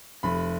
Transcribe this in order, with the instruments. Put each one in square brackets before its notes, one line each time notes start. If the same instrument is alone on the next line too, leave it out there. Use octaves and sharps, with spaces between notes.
[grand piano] F1 B5